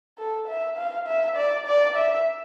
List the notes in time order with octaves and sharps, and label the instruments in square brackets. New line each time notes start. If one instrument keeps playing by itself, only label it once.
[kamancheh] A4
E5
F5
E5
D5
D5
E5